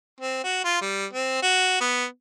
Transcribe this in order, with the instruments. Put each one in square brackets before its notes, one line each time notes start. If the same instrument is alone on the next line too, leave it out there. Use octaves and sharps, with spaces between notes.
[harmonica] C4
F#4
F4
G3
C4
F#4
B3